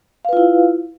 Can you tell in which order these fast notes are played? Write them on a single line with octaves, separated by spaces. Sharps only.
F5 B4 F4 E4